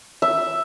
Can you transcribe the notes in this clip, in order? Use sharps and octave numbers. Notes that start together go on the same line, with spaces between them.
E5